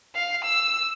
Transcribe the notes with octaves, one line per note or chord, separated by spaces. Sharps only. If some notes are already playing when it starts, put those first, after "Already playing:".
F5
E6